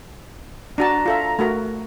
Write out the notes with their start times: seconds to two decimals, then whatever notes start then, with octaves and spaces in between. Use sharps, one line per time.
0.78 D4 F#4 A5 A#5
1.06 F4 A4 E5
1.39 A3 F#4 A#4